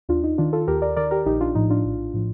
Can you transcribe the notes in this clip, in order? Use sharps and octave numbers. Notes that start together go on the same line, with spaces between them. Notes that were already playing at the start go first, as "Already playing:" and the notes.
D#2 D4 F4
D#4
D#3 D4 F4
F4 A4
D#2 G4 A#4
A#4 D5
D#3 A#4 D5
G4 A#4
A#1 D#4 G4
D4 F4
A2 F3 D#4
D4 F4
A#1
A2 F3